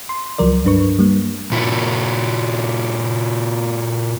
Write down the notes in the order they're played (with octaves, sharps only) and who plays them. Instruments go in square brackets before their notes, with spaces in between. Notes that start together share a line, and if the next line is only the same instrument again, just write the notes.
[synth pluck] C6
C#2 F3 F#3 A#4 D5
G2 D4 B4 C#6
G3 A#3
[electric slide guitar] A#2 E4 F#4